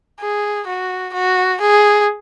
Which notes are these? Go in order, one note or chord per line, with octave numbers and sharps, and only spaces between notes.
G#4
F#4
F#4
G#4